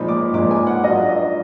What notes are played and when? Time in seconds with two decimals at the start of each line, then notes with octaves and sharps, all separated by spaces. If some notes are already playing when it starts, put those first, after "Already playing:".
Already playing: A#2 F3 G#3 D#4 B5
0.08 D6
0.34 A#2 F3 G#3 D#4 D6
0.51 G#5
0.67 F#5
0.83 G#2 F#3 D4 F4 D#5
1.09 D#5